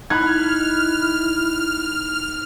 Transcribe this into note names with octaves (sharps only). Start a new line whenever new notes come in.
D#4 E4 B5 F6 F#6 G#6